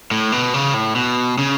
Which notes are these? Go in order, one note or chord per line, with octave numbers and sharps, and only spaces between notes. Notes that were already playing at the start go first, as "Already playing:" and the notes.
A2
B2
C#3
A2
B2
C#3